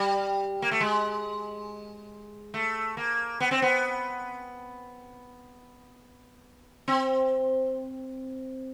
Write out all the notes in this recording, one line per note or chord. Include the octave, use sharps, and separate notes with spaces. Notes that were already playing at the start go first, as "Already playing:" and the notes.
Already playing: G3
A#3
A3
G#3
A3
A#3
B3
C4
B3
C4